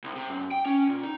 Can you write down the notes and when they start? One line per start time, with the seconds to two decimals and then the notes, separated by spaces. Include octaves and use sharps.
0.04 C2
0.16 C3
0.30 F#2
0.51 G5
0.66 C#4
0.89 A#2
1.03 D#4